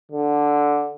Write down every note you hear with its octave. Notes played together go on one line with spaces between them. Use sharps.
D3